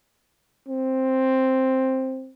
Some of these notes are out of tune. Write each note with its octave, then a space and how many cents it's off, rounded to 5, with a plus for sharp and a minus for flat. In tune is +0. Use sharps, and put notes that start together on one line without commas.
C4 +5